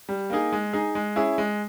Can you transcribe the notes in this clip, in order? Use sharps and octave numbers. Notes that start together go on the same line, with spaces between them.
G3
A#3 D#4 G#4
G#3
D#4 G#4
G#3
C#4 E4 G#4
G#3